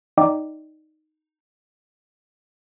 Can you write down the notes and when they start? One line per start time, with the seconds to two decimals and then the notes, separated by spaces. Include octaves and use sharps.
0.17 D#4 D5 D#5 G5 D6